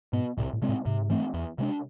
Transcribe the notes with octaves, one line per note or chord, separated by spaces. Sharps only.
G#2 B2 B3
C2 A2
A2
C3 G#3 C4
A2
G#2 C3
E3 A3 C4
E2
C3 G#3 D4